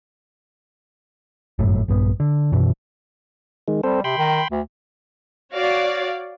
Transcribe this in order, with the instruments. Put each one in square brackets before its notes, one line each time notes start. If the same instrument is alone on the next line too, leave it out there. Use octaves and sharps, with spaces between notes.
[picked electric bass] G1 F#2 A2
A#1 G2 B3
D3
F#2 B2 E3
[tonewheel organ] D#3 G#3
[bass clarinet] G3 [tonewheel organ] C4 A4 C5
[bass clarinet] C3 [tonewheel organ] G5 B5 C6
[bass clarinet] D#3
D2
[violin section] F#4 C#5 D5 F5